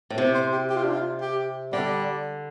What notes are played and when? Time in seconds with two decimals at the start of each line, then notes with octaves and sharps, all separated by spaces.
0.10 A2
0.18 C3
0.35 C5
0.52 G4
0.69 G4
0.76 F4
0.84 D4
0.90 F4
1.21 G4
1.73 D3 G3